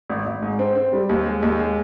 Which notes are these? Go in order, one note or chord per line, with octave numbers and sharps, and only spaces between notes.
G#1
G#1
G#2
C4
C4
G3
D#2
G#3
D#2
G#3